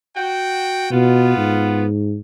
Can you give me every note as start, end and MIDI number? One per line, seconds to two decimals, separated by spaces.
0.16 0.87 66
0.16 0.87 79
0.92 1.35 47
0.92 1.85 59
0.92 1.85 65
1.37 2.20 44